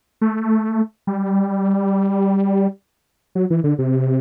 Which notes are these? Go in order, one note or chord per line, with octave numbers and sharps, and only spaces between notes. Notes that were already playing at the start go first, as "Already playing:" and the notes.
A3
G3
F#3
E3
D3
C3